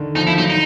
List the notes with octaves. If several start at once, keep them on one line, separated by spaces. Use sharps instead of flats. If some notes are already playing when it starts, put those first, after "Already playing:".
Already playing: D3 D#3
F3 D#4
F3 E4
F#3 D#4
D#4